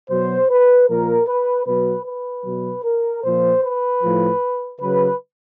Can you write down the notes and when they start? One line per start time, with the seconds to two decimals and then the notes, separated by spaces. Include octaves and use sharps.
0.10 B2 F#3 C5
0.50 B4
0.89 A#2 F3 A#4
1.28 B4
1.67 B2 F#3 B4
2.06 B4
2.45 B2 F#3
2.84 A#4
3.24 A#2 F3 C5
3.63 B4
4.02 A2 F3
4.80 C#3 F#3 B4